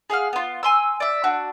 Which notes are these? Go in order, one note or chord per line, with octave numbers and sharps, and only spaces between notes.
G#4 F5 F#5 F6
B3 F4
G#5 C6 E6
D5 E5
D4 F#4